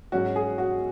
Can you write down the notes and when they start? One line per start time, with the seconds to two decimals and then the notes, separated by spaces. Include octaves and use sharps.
0.12 G#2 F#3 C#4 F#4
0.36 G#4
0.58 F#4